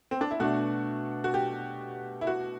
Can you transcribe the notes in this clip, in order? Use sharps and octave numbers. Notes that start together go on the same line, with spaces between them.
C4
D4
E4
B2 A3 D4 F#4
F#4
G4
E4
F#4